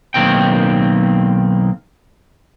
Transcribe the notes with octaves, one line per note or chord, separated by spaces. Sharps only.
B1 D#3 A#3 C4 G5